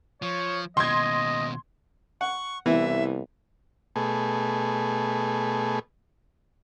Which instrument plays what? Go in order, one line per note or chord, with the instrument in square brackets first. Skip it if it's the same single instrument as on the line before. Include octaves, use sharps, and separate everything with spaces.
[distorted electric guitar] F3 [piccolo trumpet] C#5
[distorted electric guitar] D#2 B2 [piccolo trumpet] D#5 [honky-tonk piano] C6 G#6
[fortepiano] F#5 [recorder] C#6
[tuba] C2 [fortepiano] E3 [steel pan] B3 [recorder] E5
[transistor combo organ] B2 A3 G#4